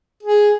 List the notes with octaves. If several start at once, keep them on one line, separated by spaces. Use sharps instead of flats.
G#4